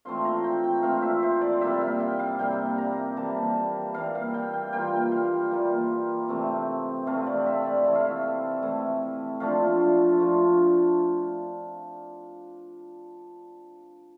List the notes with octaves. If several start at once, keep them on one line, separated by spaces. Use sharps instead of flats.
E3 A3 C4 F4 C6
A#5
G5
G5
E3 A3 C4 F4 F5
E5
C5
D5
C3 G3 A#3 E4 E5
F5
G5
F5
C3 G3 A#3 E4 G5
A#5
E3 G3 A#3 A5
E3 G3 A#3 F5
F5
G5
G5
E3 G3 A#3 F4 G5
F5
E3 G3 A#3 F4
C3 E3 A3 C4
C3 E3 A3 C4 F5
D5
E5
D5
E3 A3 E4 E5
F5
E5
E3 A3 E4
F3 A3 D4 F4 F5
F3 A3 D4 F4